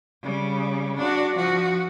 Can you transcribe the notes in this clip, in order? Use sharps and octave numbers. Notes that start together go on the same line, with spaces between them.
C#3 G3
D4 F#4
F3 F#4